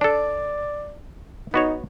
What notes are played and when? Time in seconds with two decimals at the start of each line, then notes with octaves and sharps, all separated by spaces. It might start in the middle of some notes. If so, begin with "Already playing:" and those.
0.01 D4 A4 D5
1.54 B3 D#4 F#4 C#5